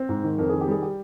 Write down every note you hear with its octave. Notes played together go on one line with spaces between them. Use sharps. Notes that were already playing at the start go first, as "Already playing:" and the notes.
Already playing: C4
G#2
D#3
F2 A#4
D#3 G#4
G4
G3 G#4
G4